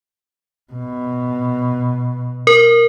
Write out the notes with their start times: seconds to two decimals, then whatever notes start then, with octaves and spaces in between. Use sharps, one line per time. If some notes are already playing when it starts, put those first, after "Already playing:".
0.73 B2
2.47 A#4